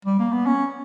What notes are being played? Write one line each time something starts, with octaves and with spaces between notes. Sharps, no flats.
G3
A#3
B3
C#4